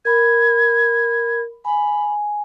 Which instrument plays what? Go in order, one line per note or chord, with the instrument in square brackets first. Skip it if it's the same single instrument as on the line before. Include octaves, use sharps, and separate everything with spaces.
[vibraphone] A#4 B5 [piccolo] G#6
[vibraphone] G#5 [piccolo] B5